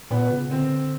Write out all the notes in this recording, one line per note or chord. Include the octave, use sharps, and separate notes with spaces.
A#2 B3
C#3
D3 C4